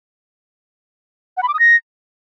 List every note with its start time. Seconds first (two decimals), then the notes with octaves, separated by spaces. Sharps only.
1.37 F#5
1.43 B5
1.48 D6
1.54 D#6
1.59 A#6